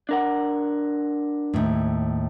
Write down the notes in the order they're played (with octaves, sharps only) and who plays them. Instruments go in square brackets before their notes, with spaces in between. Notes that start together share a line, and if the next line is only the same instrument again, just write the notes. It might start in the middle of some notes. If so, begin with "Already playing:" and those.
[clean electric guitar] D4 A#4 F#5
[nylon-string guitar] D#2 A2